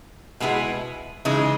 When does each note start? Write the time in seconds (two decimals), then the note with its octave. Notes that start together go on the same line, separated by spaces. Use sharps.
0.40 B2 G#3 B3 E4 G#4
1.25 C#3 E3 G#3 D#4